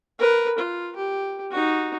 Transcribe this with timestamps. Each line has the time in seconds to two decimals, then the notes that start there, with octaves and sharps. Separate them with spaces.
0.19 A#4 B4
0.58 F4
0.96 G4
1.51 D#4 F#4